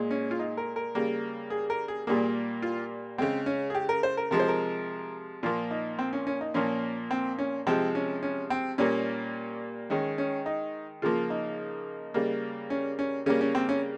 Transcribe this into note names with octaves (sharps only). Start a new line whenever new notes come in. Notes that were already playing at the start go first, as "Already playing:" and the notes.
Already playing: A#2 G#3
C#4
F4
D#4
A#4
A#4
C#3 G3 A#3
G#4
A#4
G#4
A#2 G3 A#3 G#4
F4
C#3 G#3 C4
C#4
G#4
G4
A#4
C5
A#4
C3 F3 G#3 A#4
C5
A#4
A#2 F3 A#3 F4
D#4
C4
C#4
C#4
D#4
A#2 F3 A#3 C#4
C4
C#4
C3 F3 G#3 C4
C#4
C#4
C4
A#2 G3 A#3 C#4
D#3 G#3 C#4
C#4
D#4
C#3 F3 A#3 F4
D#4
C#3 G3 A#3
C#4
C#4
C#3 G3 A#3 C#4
C#4
C4
C#4